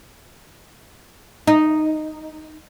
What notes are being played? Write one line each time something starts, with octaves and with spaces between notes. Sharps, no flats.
D#4